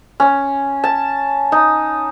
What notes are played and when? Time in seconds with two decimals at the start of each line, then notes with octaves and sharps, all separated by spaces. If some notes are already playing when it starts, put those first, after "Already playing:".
0.20 C#4
0.84 A5
1.52 D#4